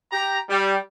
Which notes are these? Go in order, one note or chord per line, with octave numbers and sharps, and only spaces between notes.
G4 A#5
G3